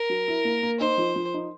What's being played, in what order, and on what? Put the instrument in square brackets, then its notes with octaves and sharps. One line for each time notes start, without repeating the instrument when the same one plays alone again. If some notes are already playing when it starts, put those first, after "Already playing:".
Already playing: [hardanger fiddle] A#4
[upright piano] F#3
E4
A#3
A#3
[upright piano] D#4 [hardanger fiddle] C5
[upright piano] F3
F3
D#4